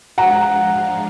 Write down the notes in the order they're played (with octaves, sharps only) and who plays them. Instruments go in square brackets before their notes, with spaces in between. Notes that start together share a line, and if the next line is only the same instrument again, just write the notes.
[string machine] F3 G#3 D4 F4 [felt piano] F#5 A#5